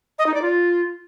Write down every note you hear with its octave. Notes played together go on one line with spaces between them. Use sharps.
D#5
D#4
D5
F4